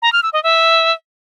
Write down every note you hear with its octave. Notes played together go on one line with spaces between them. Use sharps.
A#5
F6
E6
D#5
E5